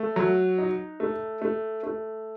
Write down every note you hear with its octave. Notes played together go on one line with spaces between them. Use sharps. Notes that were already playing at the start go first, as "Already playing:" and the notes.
Already playing: A3
F#3
D#4
A3
A3
A3